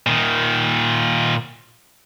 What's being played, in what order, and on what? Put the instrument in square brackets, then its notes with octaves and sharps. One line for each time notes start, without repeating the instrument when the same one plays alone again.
[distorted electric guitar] A#2 D#3